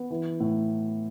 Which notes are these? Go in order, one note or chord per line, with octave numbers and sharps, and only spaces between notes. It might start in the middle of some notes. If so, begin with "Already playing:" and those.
Already playing: B3
E3
A2